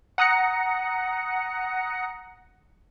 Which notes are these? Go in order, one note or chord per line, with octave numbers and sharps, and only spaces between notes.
F#5 A#5 D#6 F#6 A#6 C#7